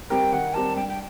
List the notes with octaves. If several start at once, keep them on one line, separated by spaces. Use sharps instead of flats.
G3 C4 G4 A#4 G5
D#3 F#5
G3 C4 G4 A#4 A5
G2 G5
G5